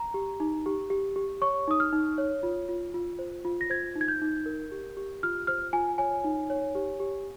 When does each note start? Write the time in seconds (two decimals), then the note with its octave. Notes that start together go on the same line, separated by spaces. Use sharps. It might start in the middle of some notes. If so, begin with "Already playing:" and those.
Already playing: A#5
0.14 G4
0.40 D#4
0.66 G4
0.90 G4
1.16 G4
1.41 C#5 C#6
1.68 D#4 D#6
1.80 F6
1.92 D#4
2.18 C#5
2.43 F4
2.69 F4
2.94 F4
3.19 C5
3.45 F4
3.61 A#6
3.70 C5 G#6
3.96 D#4
4.01 G#6
4.08 G6
4.21 D#4
4.46 A#4
4.72 G4
4.97 G4
5.23 F4 F6
5.47 C5 F6
5.73 F4 G#5
5.98 C#5 G#5
6.24 D#4
6.50 C#5
6.75 G4
7.00 G4